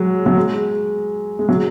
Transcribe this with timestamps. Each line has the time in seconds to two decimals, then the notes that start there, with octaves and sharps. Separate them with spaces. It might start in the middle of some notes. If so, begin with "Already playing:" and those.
Already playing: F#3 G#3
0.26 F#3
0.36 G#3
1.39 G#3
1.49 F#3